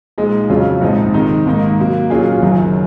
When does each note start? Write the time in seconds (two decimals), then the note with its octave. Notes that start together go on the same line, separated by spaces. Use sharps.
0.18 A#2 F3 G#3 D#4
0.50 F2 C#3 F#3 C#4 F4
0.81 A#1 G#2 F3 C4 D#4
1.14 C3 D#3 G#3 D#4
1.46 G#2 D#3 A#3 D#4
1.78 C3 F#3 A#3
2.10 A#2 F#3 C#4 F4 G#4
2.42 F#1 F#2 D#3